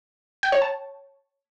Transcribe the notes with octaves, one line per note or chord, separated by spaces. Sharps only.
G5
C#5
A5